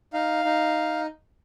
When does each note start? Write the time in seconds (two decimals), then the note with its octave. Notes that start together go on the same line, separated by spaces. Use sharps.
0.13 D#4 F5
0.45 D#4